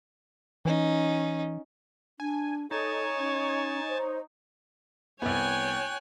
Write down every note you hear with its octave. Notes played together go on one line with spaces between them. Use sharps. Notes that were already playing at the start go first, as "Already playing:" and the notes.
E3 C#4 D#4
D4 G#5
D#4 A4 C#5 G#5 A5
C#4
C5
C2 B3 C#5 G5 G#5 F#6